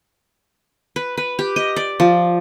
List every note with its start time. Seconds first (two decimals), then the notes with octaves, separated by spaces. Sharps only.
0.96 B4
1.17 B4
1.39 G4
1.56 D#5
1.76 D5
2.00 F3